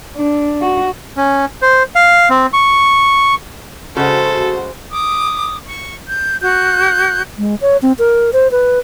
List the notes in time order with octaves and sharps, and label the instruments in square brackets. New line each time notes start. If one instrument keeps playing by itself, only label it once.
[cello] D4
F#4
[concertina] C#4
C5
F5
C4
C#6
[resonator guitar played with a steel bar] C#3 G#3 [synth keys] F#4 [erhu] A4 [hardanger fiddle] C5
[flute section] D6 D#6
C#6
G6
F#4 F#6 G6
[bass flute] G#3
C#5
C4
A#4
C5
B4